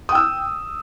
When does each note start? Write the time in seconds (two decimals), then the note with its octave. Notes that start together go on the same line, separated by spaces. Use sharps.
0.09 D#6
0.12 G5
0.15 E6